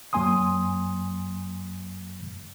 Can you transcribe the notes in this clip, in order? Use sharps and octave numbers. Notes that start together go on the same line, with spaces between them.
F#2 F#3 A#3 G#5 C6 D#6